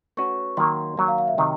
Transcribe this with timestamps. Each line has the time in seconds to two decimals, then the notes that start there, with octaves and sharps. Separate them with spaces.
0.17 A3 C#4 F#4 B4 C#6
0.57 D#3 F#3 A#3 C6
0.97 D#3 F#3 A#3
1.08 F5
1.18 F5
1.28 E5
1.38 C3 D#3 F#3 D#5